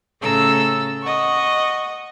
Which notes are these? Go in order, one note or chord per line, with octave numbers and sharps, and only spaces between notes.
A2 C#3 A4 A#5 E6
D#5 F#5 C#6